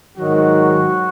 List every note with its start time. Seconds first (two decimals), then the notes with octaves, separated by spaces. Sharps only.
0.17 G#2 D#3 F#3 F#4